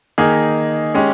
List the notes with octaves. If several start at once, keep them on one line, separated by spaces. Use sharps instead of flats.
D#3 A#3 D#4 G#4
G#3 C#4 G4